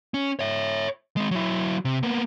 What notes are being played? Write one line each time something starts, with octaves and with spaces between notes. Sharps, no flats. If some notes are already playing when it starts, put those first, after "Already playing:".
C#4
C#5 E5
G#3 C4
F#3 E4
C3
A#3 B3